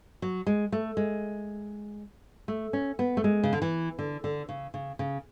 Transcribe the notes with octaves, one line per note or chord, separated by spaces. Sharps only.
F#3
G#3
A3
G#3
A3
C#4
B3
A3
G#3
C#3
D3
E3
D3
D3
C#3
C#3
C#3